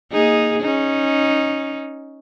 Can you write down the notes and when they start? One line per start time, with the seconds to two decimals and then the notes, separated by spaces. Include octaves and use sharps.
0.12 A#3 D#4 G#4
0.62 C#4 D#4